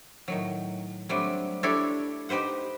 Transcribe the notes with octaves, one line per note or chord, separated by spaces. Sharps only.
A2 D#3 F#3
F#3 G3 A3 C4 D4
D4 E4 G4 A4 C#5
D#4 G4 B4 C5 F#5